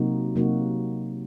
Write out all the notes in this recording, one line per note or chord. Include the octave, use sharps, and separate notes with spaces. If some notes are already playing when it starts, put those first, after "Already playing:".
Already playing: C3 F#3 A#3 D#4 F#4
C3 F#3 A#3 D#4 F#4